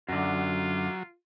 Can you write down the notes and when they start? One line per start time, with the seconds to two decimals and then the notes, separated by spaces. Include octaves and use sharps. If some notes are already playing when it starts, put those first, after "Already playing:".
0.09 F#2 D3 F#3 F4